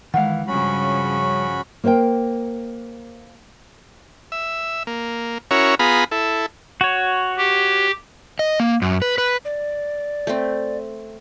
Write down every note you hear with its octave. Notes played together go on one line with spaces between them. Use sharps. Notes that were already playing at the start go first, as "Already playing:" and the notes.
D#3 E3 G#3 F5 F#5
G2 C#3 F3 G3 C#4 F#4 B5
A#3 A#4 C5 F#5 G5
E5
A#3
C#4 E4 F#4 A#4 C#5
B3 F4 G#4 A#5 B5
E4 A4
F#4 C#5
G4
D#5
A#3
F#2
B4
B4
D5
A3 C4